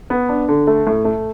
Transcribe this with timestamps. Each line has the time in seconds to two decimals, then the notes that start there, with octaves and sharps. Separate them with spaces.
0.10 B3
0.29 D4
0.48 D3
0.67 A3
0.87 A2
1.05 A3